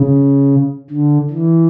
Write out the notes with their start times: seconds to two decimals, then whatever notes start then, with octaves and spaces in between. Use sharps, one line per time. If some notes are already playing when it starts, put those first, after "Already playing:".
Already playing: C#3
0.91 D3
1.30 E3